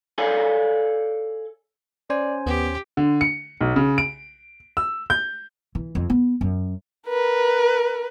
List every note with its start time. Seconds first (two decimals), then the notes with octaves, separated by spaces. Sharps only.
0.18 A4 C#5 D5 F5 G#5
2.10 C#4 C5 D5 G#5
2.46 D#2 B3 G4
2.97 D3
3.21 C#7
3.61 B1
3.76 C#3
3.98 D7
4.77 E6
5.10 G6
5.75 E3
5.95 F2
6.10 B3
6.41 F#2
7.08 A#4 B4